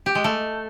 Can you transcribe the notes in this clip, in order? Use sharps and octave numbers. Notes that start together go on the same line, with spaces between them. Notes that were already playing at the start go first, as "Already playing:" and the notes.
G4
G#3
A3